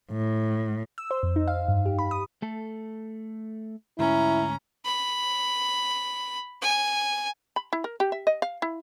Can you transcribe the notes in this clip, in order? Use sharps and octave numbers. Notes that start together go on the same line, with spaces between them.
A2
E6
C5
F2
D#4
F5
G2
G4
B5
D#6
A3 A4
D2 G#2 C#4 E4 A#5
B5
G#5
B5
E4
A#4
G4
E5
D#5
F5
E4